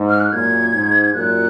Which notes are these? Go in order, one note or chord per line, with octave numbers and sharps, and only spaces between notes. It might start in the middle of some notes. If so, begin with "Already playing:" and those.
Already playing: G#2
F6
F#6
F#2 A#2 G#6
G#2
F#2 A#2 F#6